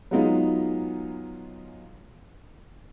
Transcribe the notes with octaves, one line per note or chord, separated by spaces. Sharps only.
F#3 G#3 B3 D#4 F4